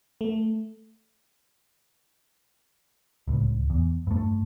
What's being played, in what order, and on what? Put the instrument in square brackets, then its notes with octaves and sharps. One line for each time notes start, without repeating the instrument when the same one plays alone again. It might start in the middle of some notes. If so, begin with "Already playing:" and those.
[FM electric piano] A3
[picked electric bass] D1 C#2
E2
G2 A3